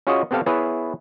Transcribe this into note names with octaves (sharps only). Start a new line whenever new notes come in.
C#4 F4 F#4 G#4 C#5 D#5
B3 C4 G4 A4 F5
B3 E4 G#4 B4 C#5 E5